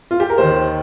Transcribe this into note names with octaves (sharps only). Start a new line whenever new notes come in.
F4
G4
A#4
D#2 D#3 C5